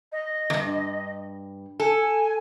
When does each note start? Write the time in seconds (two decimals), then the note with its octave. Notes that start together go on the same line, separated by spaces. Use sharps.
0.12 D#5
0.50 E2 G2
1.80 A4 G#5